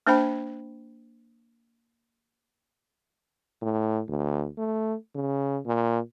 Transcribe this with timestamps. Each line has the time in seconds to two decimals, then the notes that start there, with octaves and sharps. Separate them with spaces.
0.07 A#3 D4 C5 G5 B5
3.62 A2
4.08 D2
4.58 A3
5.15 C#3
5.66 A#2